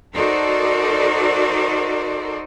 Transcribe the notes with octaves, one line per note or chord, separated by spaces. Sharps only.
D#4 F#4 A4 A#4 C5 D5